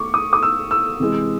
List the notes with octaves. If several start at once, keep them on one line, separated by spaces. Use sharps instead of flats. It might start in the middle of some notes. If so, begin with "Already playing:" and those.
Already playing: A3 C#6 D6
D#6
D#6
E6
E6
C3 E3 G#3